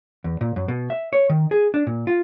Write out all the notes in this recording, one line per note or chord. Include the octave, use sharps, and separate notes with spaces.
E2
A#2
F#2
B2
E5
C#5
D#3
G#4
D4
A#2
F4